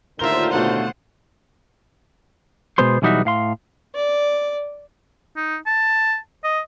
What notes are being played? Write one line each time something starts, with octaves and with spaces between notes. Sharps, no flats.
D#2 A2 D3 F4 A#4 C5 E5 G7
B2 A3 D4 F#5
B2 G#3 B3 C5 C6
B1 E3 G3 D#4 F#4 E5
A2 F5 C6
D5
D#4
A5
D#5